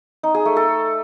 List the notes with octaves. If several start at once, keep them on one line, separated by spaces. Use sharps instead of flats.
D#4
G#4
A3
A4